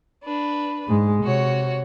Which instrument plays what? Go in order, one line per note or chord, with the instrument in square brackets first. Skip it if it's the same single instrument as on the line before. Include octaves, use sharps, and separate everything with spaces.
[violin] D4 B4
[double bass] G#2 G#3
[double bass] C3 [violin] F#4 C#5